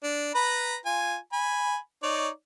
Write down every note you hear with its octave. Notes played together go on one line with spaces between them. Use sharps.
D4
B4 A#5 B5
F4 G#5
G#5 B5
D#4 C#5 D5